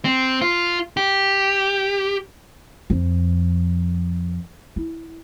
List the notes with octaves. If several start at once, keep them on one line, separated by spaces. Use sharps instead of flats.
C4
F4
G4
F2
E4